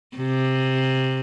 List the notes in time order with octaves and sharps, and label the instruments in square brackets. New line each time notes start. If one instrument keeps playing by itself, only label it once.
[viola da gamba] C3